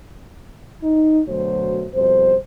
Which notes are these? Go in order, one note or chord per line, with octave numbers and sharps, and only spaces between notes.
D#4
D2 B2 F#3 A3 F#4 C5
F2 B2 G3 C5